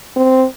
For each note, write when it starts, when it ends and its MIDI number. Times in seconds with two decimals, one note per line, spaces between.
0.16 0.45 60